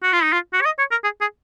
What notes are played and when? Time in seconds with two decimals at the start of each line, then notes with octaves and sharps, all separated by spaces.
0.03 F#4
0.13 F4
0.23 D#4
0.32 F4
0.53 F#4
0.61 C#5
0.66 D#5
0.79 C#5
0.91 A#4
1.04 G#4
1.21 G#4